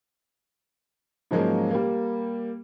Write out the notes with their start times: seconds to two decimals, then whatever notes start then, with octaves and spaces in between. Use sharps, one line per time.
1.31 G#2 F3 F#3 G#3 A#3 C#4
1.71 G3 A#3